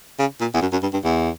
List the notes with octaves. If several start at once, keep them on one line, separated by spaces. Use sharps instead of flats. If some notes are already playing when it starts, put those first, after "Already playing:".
C#3
A#2
E2
F#2
F#2
G2
G2
E2